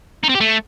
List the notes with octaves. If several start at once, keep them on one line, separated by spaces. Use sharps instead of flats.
D#4
C4
G4
A3